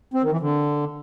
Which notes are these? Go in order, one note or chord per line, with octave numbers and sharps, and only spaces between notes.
C4
D#3
E3
D3